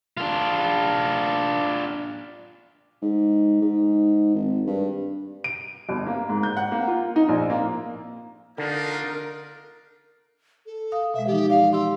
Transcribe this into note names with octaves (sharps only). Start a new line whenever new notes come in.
D4 F4
G#2
G#2
G#1
G2
D7
G1
A#3
G#2
G6
F#5
A#3
F4
D#4
A#1
A#3
D3 D4 D#4 F4 A#4
A4
F5 D#6
B2 G#3 E5
E3 F3 D#4 G4
D5 F5
G4 C6 E6